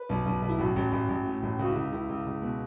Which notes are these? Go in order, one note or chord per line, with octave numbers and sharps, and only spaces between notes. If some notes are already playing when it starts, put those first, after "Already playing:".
Already playing: B4
B1
B1
B1
E4
A1 F#4
A1
A1
A1
A2
A1
C#2 F#4
E4
C#2
C#2 E4
C#2
C#2
B2